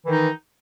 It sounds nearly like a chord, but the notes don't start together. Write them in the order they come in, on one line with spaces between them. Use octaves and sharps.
E3 D#3 D#4